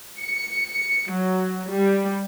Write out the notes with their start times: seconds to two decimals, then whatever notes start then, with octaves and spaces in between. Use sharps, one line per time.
0.20 C#7
1.10 F#3
1.71 G3